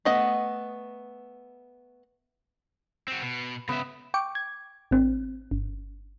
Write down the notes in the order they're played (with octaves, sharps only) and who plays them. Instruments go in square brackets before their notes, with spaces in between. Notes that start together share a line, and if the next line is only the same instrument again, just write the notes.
[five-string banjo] A3 B3 D#5 F#5
[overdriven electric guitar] C4 F#4
B2
[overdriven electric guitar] C#3 E5 [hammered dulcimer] B3
[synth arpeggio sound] G5 C#6 D6
G#6
G#1 C4
G1